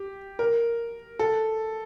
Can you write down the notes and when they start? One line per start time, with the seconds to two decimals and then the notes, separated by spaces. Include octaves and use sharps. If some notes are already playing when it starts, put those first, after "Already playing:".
Already playing: G4
0.39 A#4
1.19 A4